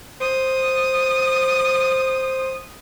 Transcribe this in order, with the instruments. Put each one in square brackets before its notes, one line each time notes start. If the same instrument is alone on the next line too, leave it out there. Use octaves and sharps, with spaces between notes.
[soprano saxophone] C5 [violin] D#6